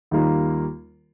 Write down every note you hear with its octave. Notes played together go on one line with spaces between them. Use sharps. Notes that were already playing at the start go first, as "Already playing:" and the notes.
D#2 D#3 G3 A#3 F4